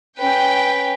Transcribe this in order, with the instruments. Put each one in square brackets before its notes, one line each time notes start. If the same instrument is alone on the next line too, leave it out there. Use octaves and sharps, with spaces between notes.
[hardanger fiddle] C#4 B4 [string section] G5